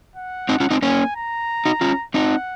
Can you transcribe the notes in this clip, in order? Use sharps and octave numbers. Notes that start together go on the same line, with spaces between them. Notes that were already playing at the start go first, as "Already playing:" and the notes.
F#5
C4 D#4
C#4 F4
C4 D#4
A#3 C#4 G#5
A#5
D#4 F#4
C#4 F4
C4 D#4 F#5